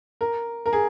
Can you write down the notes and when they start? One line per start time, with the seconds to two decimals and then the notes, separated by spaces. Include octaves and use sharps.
0.21 A#4
0.66 A#4
0.73 G#4